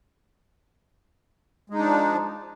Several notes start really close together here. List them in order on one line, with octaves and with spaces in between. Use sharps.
G#3 D#4 D4 F3